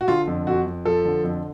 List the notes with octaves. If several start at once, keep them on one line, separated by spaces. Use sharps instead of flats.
F#4
D3 F4
F2
F2 F#4
F2
F3 A4
D3
F2